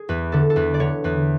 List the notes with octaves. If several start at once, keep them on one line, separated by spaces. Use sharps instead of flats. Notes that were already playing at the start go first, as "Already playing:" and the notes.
Already playing: G#4
E2 B4
D3 A4
A4
E2 B4
D5
D3 C#5
E2 B4